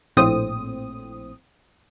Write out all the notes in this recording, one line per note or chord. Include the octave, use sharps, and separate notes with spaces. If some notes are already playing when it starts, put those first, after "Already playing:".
A#1 A2 C4 D#6